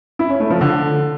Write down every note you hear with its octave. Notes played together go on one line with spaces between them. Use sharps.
E4
C#4
A3
F3
D3